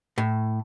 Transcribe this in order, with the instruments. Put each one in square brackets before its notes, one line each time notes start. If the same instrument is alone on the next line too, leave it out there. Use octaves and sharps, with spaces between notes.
[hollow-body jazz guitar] A2